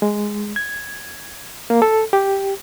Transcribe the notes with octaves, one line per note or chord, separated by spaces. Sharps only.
G#3
G#6
A#3
A4
G4